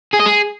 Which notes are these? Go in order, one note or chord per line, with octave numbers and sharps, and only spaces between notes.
G#4
D#5
G#4